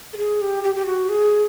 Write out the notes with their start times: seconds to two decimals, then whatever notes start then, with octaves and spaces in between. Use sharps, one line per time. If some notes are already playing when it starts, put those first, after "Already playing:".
0.13 A4
0.17 G#4
0.41 G4
0.64 G4
0.75 G4
0.86 F#4
1.09 G#4